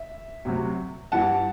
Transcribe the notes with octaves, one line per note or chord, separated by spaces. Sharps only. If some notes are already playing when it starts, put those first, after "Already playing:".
Already playing: E5
D2 C3 F#3
G2 E3 F#5 A5